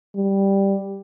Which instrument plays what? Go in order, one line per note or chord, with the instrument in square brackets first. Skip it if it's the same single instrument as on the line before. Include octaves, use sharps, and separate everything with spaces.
[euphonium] G3